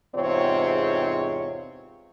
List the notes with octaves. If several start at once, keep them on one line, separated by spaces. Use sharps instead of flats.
E2 G#2 C3 C4 F4 C#5